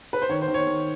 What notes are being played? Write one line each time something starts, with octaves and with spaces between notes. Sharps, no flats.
B4
C5
D#3 C#5
C5
D#3
C#5
D#3